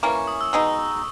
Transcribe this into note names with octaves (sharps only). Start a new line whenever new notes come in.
E3 A#3 C#4 C#6
C#6
D#6
E6
B2 G#3 D#4 E6